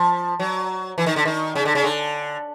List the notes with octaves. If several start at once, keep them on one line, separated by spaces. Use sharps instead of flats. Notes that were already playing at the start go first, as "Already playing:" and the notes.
Already playing: F3
F#3
E3
D#3
D3
D#3
C#3
D3
C#3
D3